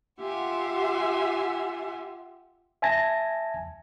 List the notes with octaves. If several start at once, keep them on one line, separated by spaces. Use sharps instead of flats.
F4 G4 E5 F#5 G#5
E5 G#5 A5 G#6 A#6